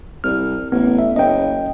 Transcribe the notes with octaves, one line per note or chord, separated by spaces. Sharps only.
C2 F6
A1 B3
E5
F#1 D#5 G5